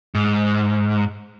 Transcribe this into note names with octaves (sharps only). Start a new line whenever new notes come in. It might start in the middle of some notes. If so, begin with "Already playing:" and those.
G#2